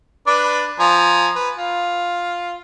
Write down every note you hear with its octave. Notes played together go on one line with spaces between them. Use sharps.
D4 B4 D5
F3 G#5 A#5
B4
F4